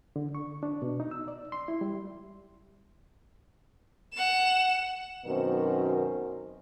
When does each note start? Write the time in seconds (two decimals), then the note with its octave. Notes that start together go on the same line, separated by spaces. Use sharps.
0.16 D3
0.35 C#6
0.63 D4
0.82 B2
1.00 D#4
1.11 E6
1.28 D5
1.52 C6
1.68 E4
1.81 G3
4.14 F#5 E7
5.26 F#2 B2 D#3 C4 A#4 C5